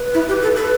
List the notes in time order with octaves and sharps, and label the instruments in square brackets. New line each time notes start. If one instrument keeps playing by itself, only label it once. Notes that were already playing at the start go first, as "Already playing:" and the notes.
Already playing: [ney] B4
[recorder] E4
G4
A4
[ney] A4 [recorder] B4